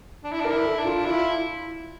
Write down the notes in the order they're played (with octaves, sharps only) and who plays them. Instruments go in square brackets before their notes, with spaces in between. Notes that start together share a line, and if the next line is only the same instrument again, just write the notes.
[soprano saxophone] D4
E4
[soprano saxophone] D4 [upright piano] A#4
[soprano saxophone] E4
[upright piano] A4
[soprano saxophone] D4
[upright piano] F4
[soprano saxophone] E4 [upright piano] F4